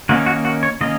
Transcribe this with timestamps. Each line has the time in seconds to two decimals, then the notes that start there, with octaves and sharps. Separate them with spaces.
0.09 D#3 A#3 C#4 F#4
0.26 F#4
0.45 F#4
0.63 C#5
0.81 D#3 A#3 C#4 D#5